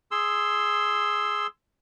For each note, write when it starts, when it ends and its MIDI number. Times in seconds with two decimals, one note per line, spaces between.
0.11 1.47 68
0.11 1.47 84
0.11 1.47 88